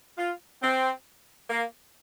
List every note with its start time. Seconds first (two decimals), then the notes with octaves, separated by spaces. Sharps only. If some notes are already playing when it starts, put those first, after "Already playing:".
0.18 F4
0.62 C4
1.49 A#3